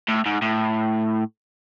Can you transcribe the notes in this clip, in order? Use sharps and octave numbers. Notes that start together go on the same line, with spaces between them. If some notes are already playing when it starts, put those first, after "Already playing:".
A2
G#2
A2